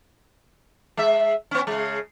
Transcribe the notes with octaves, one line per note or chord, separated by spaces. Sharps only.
G#3 E5
B3 C#4
C#3 G#3